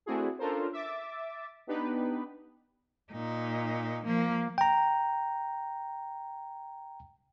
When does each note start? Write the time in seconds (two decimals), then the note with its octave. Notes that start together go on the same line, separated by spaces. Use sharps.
0.06 A3 C4 D4 E4 F#4 G#4
0.39 C#4 D4 F4 A4 A#4 C5
0.73 E5 D6 A6
1.67 B3 D4 D#4 G4 B4
3.12 A#2 D#4
4.05 F3 A#3
4.58 G5 A#5